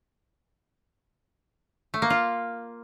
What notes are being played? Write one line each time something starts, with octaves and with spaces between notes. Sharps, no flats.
A3
A#3
F4